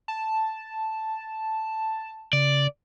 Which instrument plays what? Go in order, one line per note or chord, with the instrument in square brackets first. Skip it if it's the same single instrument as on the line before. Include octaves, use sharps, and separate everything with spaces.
[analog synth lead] A5
[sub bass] C#3 [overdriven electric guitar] D5